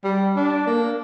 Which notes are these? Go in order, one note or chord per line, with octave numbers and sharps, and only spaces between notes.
G3
D4
A#3